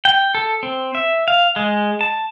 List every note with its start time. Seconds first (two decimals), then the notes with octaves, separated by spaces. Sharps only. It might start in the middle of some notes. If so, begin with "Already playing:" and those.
0.05 G5
0.35 A4
0.63 C4
0.95 E5
1.28 F5
1.56 G#3
2.01 A5